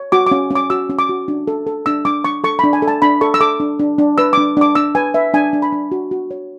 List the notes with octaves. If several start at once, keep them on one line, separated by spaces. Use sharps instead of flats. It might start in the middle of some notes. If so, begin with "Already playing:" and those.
Already playing: C#5
F#4 D6
C#4 D6
C#4
D6
F#4 E6
C#4
D6
F#4
D4
A4
A4
D4 E6
D4 D6
D4 C#6
A4 C#6
D4 B5
G#5
A4
A5
D4 B5
A4 C#6
E6
A4 D6
D4
D4
D4
B4 E6
D4 D6
D4 D6
D4 E6
B4 G#5
B4 E5
D4 G#5
D4
B5
D4
F#4
F#4
C#5